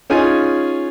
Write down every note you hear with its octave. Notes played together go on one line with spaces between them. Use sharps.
C#4 D#4 F4 G#4 G#5